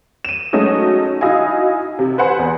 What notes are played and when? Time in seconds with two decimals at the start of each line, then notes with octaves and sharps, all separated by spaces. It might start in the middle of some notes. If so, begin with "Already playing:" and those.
0.25 D#7 E7
0.53 F#3 G#3 A3 C#4 D#4 F#4
1.21 D#4 E4 F#4 D#5 F5 G#5
1.99 C3
2.18 B4 C5 F#5 G#5 C6
2.39 E2